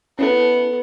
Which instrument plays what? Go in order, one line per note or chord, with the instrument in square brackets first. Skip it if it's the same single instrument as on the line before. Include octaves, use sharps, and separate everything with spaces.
[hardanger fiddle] B3 [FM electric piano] C#4 E4 A4